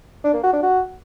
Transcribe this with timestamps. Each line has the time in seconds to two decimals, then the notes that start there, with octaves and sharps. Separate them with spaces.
0.24 D4
0.34 A#3
0.43 F#4
0.53 D4
0.63 F#4